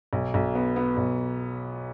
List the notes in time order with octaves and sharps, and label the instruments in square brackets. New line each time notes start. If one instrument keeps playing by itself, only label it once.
[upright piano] B1
B1
B3
B3
B1